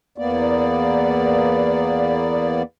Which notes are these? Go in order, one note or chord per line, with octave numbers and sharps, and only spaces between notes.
E2 A#3 B3 D5